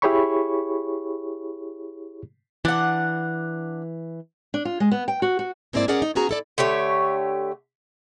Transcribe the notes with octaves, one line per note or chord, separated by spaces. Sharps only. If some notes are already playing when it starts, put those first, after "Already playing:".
E4 G4 G#4 C#5 B5 C#6
E3 D4 F#5
D4
F4
G#3
B3
G5
F#4
F#4
G#2 A#3 C4 E4 D5
A#2 C#4 G#4 A#4 D5 F#5
D#4
B3 C#4 F#4 G#4 A#5
E4 A4 D5
D3 A3 G4 C#5